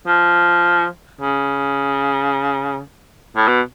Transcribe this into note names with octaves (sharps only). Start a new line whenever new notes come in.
F3
C#3
A2
B2